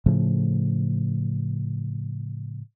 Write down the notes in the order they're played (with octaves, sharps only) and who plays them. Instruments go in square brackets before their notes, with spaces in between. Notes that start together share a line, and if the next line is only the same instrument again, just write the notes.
[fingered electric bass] A2 C#3 F3 A3